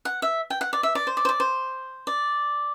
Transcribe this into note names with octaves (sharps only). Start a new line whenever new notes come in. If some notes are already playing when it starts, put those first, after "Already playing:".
F#5
E5
G5
F#5
D5
E5
D5
C5
D5
C5
D5
C5
D5